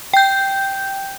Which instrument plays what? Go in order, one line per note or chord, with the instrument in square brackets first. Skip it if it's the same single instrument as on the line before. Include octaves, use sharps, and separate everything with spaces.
[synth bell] G5 G6